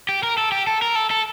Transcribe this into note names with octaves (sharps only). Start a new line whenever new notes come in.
G4
A#4
A4
G4
A4
A#4
A4
A4